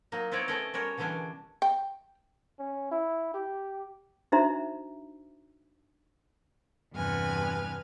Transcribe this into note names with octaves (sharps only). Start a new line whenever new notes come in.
F#3 A#3 D#4
B3 C4 D#4 E4 C#5 D5
A3 B3 C#4 D5 D#5
G3 C#4 F#4 A#4 C#5
B2 D3 E3 G3 C#4 D4
G5
C#4
E4
G4
D4 D#4 F#4 C5 E5 A#5
E2 G2 C3 B4 G#5 F6